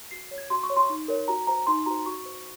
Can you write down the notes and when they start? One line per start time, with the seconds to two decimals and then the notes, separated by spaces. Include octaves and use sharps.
0.11 F#4 C7
0.31 C#5
0.38 G#6
0.50 F#4 C6
0.63 C#6
0.70 C#5
0.76 C6
0.90 D#4
1.08 A#4 C#5
1.28 F#4 A#5
1.47 C5 A#5
1.67 D#4 C6
1.86 F#4 C5 A#5
2.06 F#4 C#6
2.26 C5